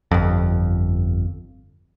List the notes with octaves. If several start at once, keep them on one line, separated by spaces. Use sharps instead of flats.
G1 F2